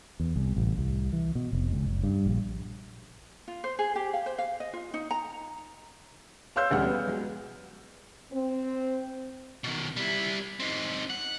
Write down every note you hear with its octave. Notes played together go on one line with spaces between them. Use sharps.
E2
C2
A1
C2
E3
B2
F1
C#2
F#1
G2
A#1
F4
C5
G#4
G4
F5
C5
F5
D#5
F4
D#4
A#5
C#5 F5 C6 E6 G6
E1 A1 D2 G3 F#5 F6
B3
F#3 G#3
C4
B2 D#3
G3 E4
C4 D#4
F#5